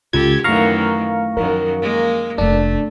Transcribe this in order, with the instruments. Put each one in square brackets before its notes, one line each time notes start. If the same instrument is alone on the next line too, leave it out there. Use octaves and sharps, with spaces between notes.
[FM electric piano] C#2 G#6 [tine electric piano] F4 [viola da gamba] G4 A4
[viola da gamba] F#2 D#3 E3 [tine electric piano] A3 C7 [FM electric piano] F5 A#5 C#6
[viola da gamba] F#2 D#3 [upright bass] F3 [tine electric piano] A#4
[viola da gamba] G#3 A#3
[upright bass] F1 F2 [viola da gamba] A3 [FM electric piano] D4